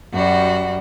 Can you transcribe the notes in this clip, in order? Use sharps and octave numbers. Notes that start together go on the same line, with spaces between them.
F#2 G3 F#4